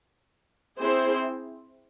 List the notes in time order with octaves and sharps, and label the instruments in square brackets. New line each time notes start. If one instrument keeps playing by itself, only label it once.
[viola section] C4 E4 G#4 C5